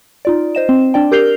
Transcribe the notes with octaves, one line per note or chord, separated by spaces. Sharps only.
D#4 F4 D5
C5 D#5 E7
C4
D4 D5 G5
G4 A#4 G6 C7 F7 G7